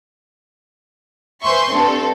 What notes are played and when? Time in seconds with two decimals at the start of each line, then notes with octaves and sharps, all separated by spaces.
1.42 B4 C5 E5 G#5 C6 C#6
1.71 G2 C4 A4